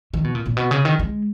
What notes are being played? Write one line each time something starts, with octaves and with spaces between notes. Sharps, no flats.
D#3
B2
A#2
A#2
B2
C#3
D#3
G#3